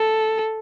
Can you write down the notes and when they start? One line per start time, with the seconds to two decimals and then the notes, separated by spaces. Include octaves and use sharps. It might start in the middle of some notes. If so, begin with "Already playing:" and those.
Already playing: A4